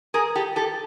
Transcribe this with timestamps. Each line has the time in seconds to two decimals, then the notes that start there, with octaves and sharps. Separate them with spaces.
0.14 G#4 A#4
0.35 G4 A4
0.56 G4 A4